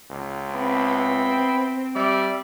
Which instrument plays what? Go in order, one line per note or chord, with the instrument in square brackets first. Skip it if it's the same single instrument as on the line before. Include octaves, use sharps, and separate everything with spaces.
[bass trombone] C#2
[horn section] B3 E4 B5 [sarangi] C4
[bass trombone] G3 [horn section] D5 E5